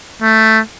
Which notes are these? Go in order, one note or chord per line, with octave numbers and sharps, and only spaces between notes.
A3